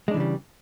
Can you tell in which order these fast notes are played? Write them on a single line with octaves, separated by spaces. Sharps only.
G#3 D4 E3 C#3 G3